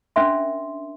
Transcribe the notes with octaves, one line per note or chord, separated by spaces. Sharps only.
C#4 D4 A#4 E5 C6